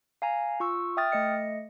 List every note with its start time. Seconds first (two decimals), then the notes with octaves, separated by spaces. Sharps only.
0.22 F5 G#5 A#5
0.60 F4 C#6 E6
0.97 E5 G5 D#6 F6 A6
1.12 A3 D#5 C#7